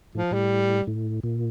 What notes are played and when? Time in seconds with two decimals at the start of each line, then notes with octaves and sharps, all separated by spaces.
0.15 A2 F3
0.31 A2 G3
0.87 A2
1.23 A#2